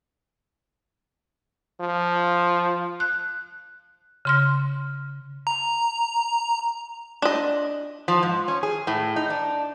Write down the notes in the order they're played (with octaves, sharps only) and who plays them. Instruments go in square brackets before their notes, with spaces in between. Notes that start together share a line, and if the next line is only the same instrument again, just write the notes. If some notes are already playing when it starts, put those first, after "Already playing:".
[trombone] F3
[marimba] F#6
C#3 C6 F6
[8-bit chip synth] A#5
[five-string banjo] D4 D#5
[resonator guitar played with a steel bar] F3
G#2
C#4
G#4
A2
D#4
D4